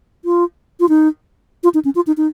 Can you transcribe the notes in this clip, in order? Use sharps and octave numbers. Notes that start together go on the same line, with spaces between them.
F4
F4
D#4
F4
D#4
C#4
F4
D#4
D#4